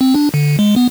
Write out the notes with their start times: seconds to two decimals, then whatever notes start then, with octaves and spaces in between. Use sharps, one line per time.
0.01 C4
0.15 D4
0.34 D3
0.59 G#3
0.76 B3